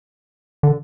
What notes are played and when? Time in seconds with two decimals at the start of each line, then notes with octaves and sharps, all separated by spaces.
0.63 D3